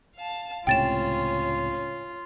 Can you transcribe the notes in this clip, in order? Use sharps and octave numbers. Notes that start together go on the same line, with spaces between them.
F5 A5
C#2 A2 C3 C#4 F4 G5 A6 E7